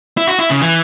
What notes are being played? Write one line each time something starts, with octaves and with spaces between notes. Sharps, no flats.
E4
F#4
E4
C#3
E3